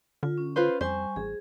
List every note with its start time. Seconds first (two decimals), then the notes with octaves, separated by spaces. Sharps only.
0.23 D3 F4
0.38 C#4
0.56 F4 B4 C5
0.81 F2 G3 C5 G#5 C#6
1.16 A1 G#4